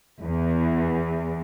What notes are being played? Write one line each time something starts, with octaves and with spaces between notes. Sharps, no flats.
E2